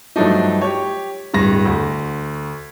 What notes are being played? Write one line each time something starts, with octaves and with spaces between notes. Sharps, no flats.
G2 F3 F#3 A3 D4 D#4
G4 C#5
D1 G2 A#6
D2